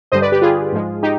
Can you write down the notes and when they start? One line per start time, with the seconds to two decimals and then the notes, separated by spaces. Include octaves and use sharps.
0.12 G2 D3 G3 C5 D#5
0.22 B4 D5
0.32 G4 B4
0.42 F4 G#4
0.72 G#2 F3 G#3
1.03 D#4 G4